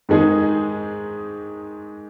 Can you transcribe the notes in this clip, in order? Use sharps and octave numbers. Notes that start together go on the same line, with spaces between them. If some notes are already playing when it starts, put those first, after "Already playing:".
G#2 D#3 G#3 D#4 G#4